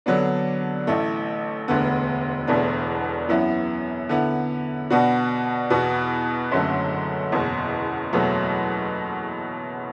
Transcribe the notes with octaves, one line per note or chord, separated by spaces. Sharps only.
D3 F#3 B3 D4
A1 A2 A3
E1 D2 D3 B3
E1 E2 B2 A3 D4
F#2 E3 B3 E4
D3 B3 E4
B2 B3 D4 F#4
E2 B2 B3 F#4
F#1 F#2 D3 F#3 A3
F#1 E2 B2
F#1 E2 B2 F#3 A3